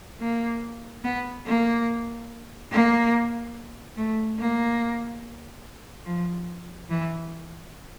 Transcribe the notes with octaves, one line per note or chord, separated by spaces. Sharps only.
A#3
B3
A#3
A#3
A3
A#3
F3
E3